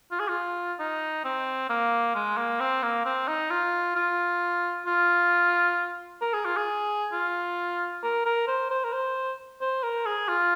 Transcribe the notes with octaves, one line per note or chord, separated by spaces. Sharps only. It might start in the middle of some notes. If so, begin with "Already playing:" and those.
F4
G#4
F4
D#4
C4
A#3
G#3
A#3
C4
A#3
C4
D#4
F4
F4
F4
A#4
G#4
F4
G#4
F4
A#4
A#4
C5
C5
A#4
C5
C5
A#4
G#4
F4